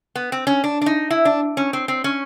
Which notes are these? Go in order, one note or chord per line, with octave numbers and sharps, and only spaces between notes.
B3
C4
C#4
D4
D4
D#4
E4
D4
C#4
C4
C4
C#4